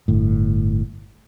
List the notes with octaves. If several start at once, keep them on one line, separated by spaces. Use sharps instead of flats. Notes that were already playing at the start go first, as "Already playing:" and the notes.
G1 A2